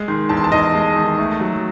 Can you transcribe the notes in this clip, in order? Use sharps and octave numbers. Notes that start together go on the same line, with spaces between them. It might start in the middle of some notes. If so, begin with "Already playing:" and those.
Already playing: G#3
D#3 C6
E2 A5
C6
A5
E2 D#5
G#3
D#3
A3
F#3